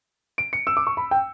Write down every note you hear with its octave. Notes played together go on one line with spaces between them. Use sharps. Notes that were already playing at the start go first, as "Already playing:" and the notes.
D7
C#7
E6
D6
C#6
B5
G5